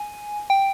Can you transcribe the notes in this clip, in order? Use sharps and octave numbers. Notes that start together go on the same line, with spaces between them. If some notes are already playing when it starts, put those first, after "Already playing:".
Already playing: G#5
G5